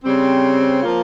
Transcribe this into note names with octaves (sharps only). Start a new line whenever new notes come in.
C#3 G3 C4
F3 A#3 F4